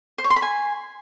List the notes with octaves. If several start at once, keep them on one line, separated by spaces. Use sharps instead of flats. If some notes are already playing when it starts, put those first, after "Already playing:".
C5
C#5
C6
B5
G#5